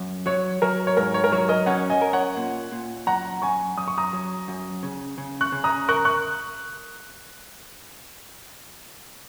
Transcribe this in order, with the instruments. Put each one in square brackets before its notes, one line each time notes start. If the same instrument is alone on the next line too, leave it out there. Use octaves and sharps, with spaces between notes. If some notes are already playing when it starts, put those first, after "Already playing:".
Already playing: [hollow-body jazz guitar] F#2
[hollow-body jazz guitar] F#3 [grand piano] C#5
[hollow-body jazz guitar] F#3 [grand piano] A#4
[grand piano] C#5
[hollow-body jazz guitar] G#2 [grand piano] A#4
[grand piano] C#5
A#4
[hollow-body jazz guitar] F#3 [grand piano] C#5
[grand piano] A#4 D#5
[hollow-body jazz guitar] C#4 [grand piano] C#5 F#5
[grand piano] D#5 G#5
[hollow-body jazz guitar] A#4
[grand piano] C#5 F#5
[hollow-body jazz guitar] A#2
A#2
[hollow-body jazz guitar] F#2 [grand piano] F#5 A#5
[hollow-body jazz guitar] F#2 [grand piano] G#5 C#6
[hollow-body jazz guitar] F#2 [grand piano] D#6
[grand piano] C#6
A#5 D#6
[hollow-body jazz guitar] F#3
F#2
C#3
C#3
[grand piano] C#6 F#6
[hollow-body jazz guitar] C#3
[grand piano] A#5 D#6
[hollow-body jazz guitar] A#4 [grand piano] C#6 F#6
[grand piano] C#6 F#6